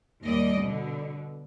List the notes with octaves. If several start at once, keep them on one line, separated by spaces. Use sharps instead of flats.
D#2 G3 D5 D#5
B2 D3